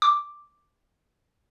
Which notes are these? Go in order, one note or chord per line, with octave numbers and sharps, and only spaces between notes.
D6